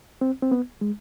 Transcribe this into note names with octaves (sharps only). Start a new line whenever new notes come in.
C4
C4
B3
G#3